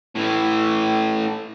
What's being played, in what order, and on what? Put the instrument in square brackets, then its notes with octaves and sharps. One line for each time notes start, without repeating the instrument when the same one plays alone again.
[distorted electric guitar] A2 E3